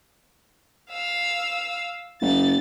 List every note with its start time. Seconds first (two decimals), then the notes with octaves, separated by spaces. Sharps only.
0.92 F5 E6
2.22 F#1 A6